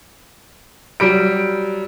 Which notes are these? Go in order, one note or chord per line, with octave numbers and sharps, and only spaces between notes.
F#3 G3 D7